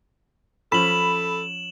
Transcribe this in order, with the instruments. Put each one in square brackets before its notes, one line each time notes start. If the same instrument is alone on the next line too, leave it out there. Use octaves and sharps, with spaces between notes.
[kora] F3 C#4 [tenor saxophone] A4 [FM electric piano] B5 [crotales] E7 F#7